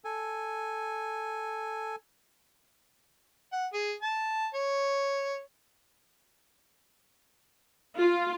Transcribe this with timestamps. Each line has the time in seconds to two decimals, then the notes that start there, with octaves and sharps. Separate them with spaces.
0.05 A4 G#5
3.53 F#5
3.74 G#4
4.02 A5
4.54 C#5
7.98 F4